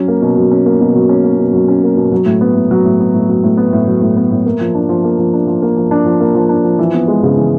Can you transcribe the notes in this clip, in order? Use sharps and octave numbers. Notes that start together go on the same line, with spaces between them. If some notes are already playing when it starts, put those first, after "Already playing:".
Already playing: F#3 C#4
A#3
B2
F#3
C#4
A#3
B2
F#3
C#4
A#3
B2
F#3
C#4
A#3
B2
F#3
A2
B3
A2
F#3
A2
B3
A2
F#3
A2
B3
A2
F#3
A2
B3
A2
A#3
F3
D4
F3
A#3
F3
D4
F3
A#3
F3
D4
F3
A#3
F3
D4
F3
E3
B3
G#3
C#3
E3